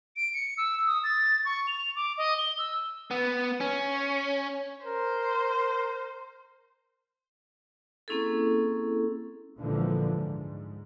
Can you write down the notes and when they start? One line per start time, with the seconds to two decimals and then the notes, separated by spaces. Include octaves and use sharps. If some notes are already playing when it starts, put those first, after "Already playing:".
0.16 D7
0.34 C#7
0.58 E6
0.87 D#6
1.04 A6
1.45 C#6
1.67 F7
1.96 D6
2.18 D#5
2.38 G7
2.59 E6
3.11 B3
3.60 C#4
4.84 A#4 C5
8.08 A#3 C4 C#4 E4 G#4 A4
9.58 C#2 A#2 D3 E3 F3
10.12 G#2